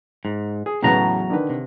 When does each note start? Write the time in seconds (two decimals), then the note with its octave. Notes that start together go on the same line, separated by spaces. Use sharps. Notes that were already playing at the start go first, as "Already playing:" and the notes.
0.25 G#2
0.66 G#4
0.83 E2 A2 C#3 F#3 B3 A#5
1.30 D3 D#3 B4
1.50 C3